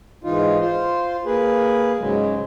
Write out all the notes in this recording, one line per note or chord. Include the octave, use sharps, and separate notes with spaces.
G#2 E3 D#4 F4
F4 C5
A#3 G#4 B4
G#2 C#3 F#3 G#3